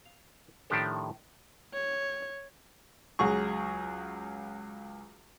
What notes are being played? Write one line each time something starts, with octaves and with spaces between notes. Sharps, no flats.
F5
A2 D#3 F3 D4 G4 A4
C#5
C#2 F#3 G#4 C#6